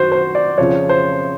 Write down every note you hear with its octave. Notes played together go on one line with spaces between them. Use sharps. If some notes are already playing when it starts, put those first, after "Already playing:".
Already playing: F#2 D#3 F#4 C5
C5
D5
F2 C#3 F3 C#5
C5